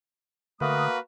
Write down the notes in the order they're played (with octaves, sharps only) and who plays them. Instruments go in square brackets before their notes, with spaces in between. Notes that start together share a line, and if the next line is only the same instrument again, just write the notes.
[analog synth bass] D3 [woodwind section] A3 D#6 [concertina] A#3 F#4 A#4 [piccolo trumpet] B4